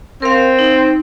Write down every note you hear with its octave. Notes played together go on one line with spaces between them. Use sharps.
C4 A#4 F5
D#4